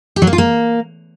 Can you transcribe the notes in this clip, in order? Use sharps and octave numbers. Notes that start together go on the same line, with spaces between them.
G4
F#3
A#3
F4
A#3